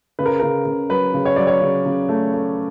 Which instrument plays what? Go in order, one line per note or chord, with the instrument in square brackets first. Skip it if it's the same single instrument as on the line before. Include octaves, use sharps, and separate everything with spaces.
[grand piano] C#3 B4
A#4
C#3 A#4
C#3
F#3 B4
C#3
C#5
F#3 D5
C#5
C#3
C#3
A3
A3